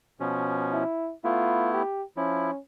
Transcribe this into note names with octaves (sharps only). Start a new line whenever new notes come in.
B2 F3 C#4
E4
A3 B3 E4 F4
G4
F3 C#4 E4